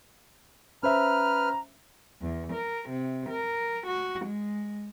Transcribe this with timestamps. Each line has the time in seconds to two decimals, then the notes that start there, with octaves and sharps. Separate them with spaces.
0.83 C#4 B4 C5 E5 A#5 F6
2.21 E2
2.53 A#4
2.89 C3
3.30 A#4
3.87 F#4
4.25 G#3